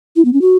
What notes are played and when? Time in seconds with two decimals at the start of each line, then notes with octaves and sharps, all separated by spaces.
0.16 E4
0.25 B3
0.33 C#4
0.41 F#4